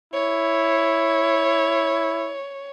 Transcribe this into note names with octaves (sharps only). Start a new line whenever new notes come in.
E4 C#5